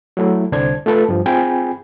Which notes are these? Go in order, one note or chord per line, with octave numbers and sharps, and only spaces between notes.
F#3 A3 E4
C2 D3 D4 C5 G#6
A3 F4 A4 B4
G2 F3
C4 F4 G#4 G5 G#5 B5